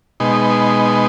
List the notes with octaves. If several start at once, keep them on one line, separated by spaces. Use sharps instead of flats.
B2 G#3 D#4